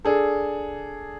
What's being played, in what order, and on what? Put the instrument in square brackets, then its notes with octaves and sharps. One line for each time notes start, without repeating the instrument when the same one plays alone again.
[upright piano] D4 G#4 A4